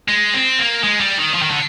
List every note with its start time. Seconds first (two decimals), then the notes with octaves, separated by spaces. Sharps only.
0.08 G#3
0.33 C4
0.59 A#3
0.84 G#3
1.01 G3
1.18 D#3
1.35 F3
1.42 D#3
1.50 D3